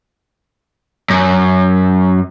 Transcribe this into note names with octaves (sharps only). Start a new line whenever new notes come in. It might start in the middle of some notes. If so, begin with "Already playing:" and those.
F#2